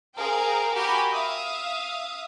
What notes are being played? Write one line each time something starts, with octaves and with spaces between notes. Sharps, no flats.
G#4 A#4 C5 F5 G5
F#4 G4 A#4 G#5 B5
E5 F5 D#6